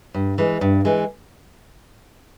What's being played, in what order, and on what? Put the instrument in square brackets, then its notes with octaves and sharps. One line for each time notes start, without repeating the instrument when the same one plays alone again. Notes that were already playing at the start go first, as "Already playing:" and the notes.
[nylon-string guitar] G2
E3 G#3
G2
E3 G#3